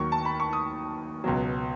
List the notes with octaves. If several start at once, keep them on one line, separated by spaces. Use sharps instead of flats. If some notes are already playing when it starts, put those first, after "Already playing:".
Already playing: D#2 D#3 F#3 C#6
A5
B5
C#6
D#6
C#2 B2 F#3